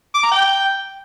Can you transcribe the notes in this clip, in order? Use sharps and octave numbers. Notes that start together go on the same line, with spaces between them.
D6
A#5
G5